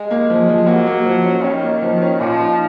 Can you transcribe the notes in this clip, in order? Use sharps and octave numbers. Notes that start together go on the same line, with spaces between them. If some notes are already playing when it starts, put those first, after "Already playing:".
Already playing: G#3
A#3
F3
F3
F#3 A#3
A#3
F3
C#4
D#3 C#4
A#3
F3
C#4
A#2 F3
D#4